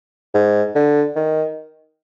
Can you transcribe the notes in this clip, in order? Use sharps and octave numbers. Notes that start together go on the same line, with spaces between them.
G#2
D3
D#3